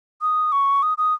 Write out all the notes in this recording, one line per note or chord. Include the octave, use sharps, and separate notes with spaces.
D#6
C#6
D#6
D#6